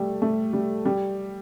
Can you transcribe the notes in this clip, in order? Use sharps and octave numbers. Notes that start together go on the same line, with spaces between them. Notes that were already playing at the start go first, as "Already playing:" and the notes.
Already playing: G3 A3
A3
G3
G3